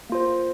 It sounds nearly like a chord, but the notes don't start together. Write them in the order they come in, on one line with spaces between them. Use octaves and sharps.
A#3 F4 C5